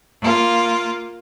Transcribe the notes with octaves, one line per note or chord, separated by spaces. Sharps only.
A#3 F4